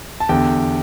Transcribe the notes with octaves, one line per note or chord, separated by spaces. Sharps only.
A5
E2 D3 G4 G5